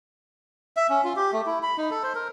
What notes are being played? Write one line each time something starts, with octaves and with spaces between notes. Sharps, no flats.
E5
C#4
F4
G4
A3
E4
B5
D#4
A4
C5
A#4